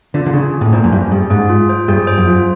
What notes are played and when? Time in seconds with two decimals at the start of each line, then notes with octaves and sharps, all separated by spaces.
0.14 D3 F4
0.26 D3
0.33 C#3 G#4
0.54 C#4
0.61 A2
0.73 A#2 C5
0.84 F#2
0.92 G2 C#4
1.11 G2 G#4
1.30 G#2 G#4
1.49 F4
1.69 C5
1.88 G2 G#4
2.07 C5
2.18 F#2
2.28 F4